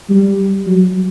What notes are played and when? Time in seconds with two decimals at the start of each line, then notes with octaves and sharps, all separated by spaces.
0.10 G3
0.67 F#3